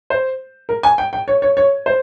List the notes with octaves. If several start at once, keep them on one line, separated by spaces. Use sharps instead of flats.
C5
A#4
G#5
G5
G5
C#5
C#5
C#5
C5